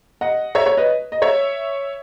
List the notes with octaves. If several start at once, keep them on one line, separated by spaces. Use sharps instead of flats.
D#5 F#5
C#5 E5
C#5
B4 D#5
D#5
C#5 E5